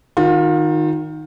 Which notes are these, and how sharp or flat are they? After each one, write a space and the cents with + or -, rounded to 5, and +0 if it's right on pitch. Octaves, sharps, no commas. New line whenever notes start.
D#3 +0 F4 +40